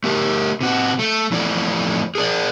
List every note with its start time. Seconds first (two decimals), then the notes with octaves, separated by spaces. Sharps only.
0.04 A3 G4 A#4
0.61 C3 F#4
0.99 A3
1.31 F2 E3 A3 E4 A4 D5
2.15 G#4 A#4 D5